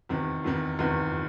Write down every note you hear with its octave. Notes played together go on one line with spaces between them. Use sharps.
F1 E2 C3 D#3
F1 E2 C3 D#3
F1 E2 C3 D#3